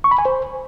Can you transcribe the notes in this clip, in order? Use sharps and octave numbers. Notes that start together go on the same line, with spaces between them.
C#6
B5
G#5
C5